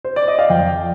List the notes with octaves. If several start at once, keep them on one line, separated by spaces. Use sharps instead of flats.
C5
D5
D#5
F5
F2 G5